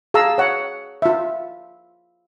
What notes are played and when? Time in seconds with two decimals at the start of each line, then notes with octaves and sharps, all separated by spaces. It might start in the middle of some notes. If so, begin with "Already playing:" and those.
0.14 G#4 F5 A5 A#5 E6
0.38 C#5 F#5
1.02 F4 E5